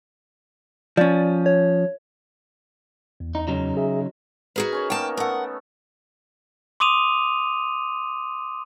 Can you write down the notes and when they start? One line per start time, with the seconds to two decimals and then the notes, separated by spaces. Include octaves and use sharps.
0.97 F3 C#4 D5
1.46 C#5
3.20 E2
3.35 D#4
3.48 C#3 F#3 D#4
3.77 G#4 E5
4.56 D#4 F#4 G#4 A#4 B4
4.72 C#4 C#5 A#5
4.90 D#3 A#3 B3 G5 A5
5.17 A3 B3 A4 A#4 F#5
6.80 C6 D6 D#6 D#7 F7